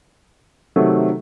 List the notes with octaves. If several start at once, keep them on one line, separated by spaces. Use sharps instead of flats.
C3 D#3 F#3 A3